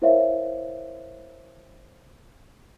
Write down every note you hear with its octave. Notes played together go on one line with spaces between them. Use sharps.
E4 A#4 C5 C#5 E5 F5